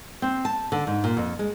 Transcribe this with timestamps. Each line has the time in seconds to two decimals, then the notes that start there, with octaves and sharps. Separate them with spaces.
0.22 C4
0.45 A5
0.72 D3
0.87 G#2
1.04 A#2
1.17 F2
1.39 G#3